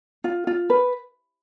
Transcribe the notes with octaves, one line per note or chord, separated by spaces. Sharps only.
F4
F4
B4